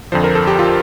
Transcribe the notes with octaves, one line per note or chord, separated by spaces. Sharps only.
F2 D3 F3 C5
A#4
A4
G4
F4